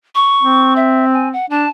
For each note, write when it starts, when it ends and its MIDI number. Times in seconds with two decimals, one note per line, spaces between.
0.15 0.73 85
0.43 1.35 60
0.76 1.05 76
1.13 1.29 80
1.33 1.46 78
1.50 1.66 62
1.50 1.69 81